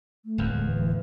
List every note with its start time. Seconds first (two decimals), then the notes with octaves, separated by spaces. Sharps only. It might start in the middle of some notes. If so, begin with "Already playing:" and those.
0.25 A3
0.38 D1 E2
0.51 G#3
0.63 E3